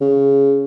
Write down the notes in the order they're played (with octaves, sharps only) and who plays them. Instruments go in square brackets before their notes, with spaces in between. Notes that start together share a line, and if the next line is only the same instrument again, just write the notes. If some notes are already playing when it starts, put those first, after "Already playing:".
[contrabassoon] C#3